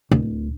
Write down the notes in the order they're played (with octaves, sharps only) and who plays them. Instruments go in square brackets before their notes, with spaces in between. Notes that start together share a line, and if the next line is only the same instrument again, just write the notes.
[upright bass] D1